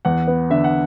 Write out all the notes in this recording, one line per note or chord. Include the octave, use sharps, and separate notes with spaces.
E2 F#5
B3
D3 E5
F#5